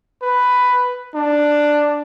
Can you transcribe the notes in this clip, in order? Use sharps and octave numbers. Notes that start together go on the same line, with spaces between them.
B4
D4